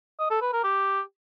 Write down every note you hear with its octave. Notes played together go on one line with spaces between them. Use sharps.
D#5
A4
B4
A#4
G4